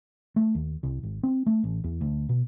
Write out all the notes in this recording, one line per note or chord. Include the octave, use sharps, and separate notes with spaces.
A3
D#2
C2
G#1
C4
A3
A1
E2
D2
B2